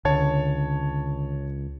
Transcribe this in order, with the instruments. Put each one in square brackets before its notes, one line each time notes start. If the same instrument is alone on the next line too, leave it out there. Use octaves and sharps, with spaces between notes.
[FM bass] C#2 [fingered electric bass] D3 [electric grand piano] C#5 A5 G#6